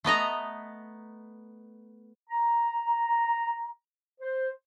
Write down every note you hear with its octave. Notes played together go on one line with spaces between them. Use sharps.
A3 B3 D#5 A#5
A#5
C5